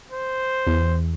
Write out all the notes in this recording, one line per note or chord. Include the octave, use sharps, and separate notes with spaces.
C5
E2